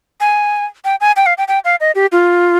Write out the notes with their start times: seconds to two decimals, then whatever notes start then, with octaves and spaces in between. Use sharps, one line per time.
0.21 G#5
0.85 G5
1.01 G#5
1.16 G5
1.26 F5
1.38 G5
1.48 G5
1.65 F5
1.80 D#5
1.95 G4
2.12 F4